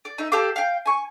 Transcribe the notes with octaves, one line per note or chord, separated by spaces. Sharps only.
D5
D#4 E5
G4 A4 F5 D6
F5 G5
G#5 C#6